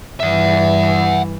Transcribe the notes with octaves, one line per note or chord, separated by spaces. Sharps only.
G2 E3 E5 F#5